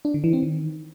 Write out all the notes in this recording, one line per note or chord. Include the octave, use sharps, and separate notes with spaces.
D4
D3
E3
C4
D#3